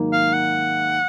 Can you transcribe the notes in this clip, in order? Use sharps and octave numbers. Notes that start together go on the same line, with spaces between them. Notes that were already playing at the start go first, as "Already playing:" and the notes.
Already playing: G#2 D#3 F#3 A#3
F5
F#5